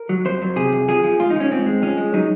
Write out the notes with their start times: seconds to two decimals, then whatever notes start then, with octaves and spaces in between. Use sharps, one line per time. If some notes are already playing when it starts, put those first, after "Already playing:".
Already playing: A#4
0.09 F#3
0.25 F2 C5
0.42 F#3
0.56 C3 G#4
0.72 F2
0.88 F3 G#4
1.04 F3
1.20 G#2 F4
1.30 D#4
1.36 F3 C#4
1.51 G#2 C4
1.66 G#3
1.82 F3 C#4
1.97 G#3
2.14 F#3 D#4